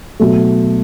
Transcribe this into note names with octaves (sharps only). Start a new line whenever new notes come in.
B2 F#3 A3